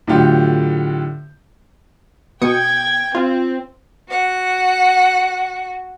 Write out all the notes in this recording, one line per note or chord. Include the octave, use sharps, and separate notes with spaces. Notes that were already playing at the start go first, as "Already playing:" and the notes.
A2 D3 F#3 F4 G4
B2 G5 D#6 G#6 C#7
C4 F4
F#4 F#5